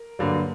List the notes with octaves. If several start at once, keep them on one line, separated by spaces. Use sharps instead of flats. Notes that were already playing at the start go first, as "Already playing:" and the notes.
Already playing: A#4
G2 D3 F#3 A#3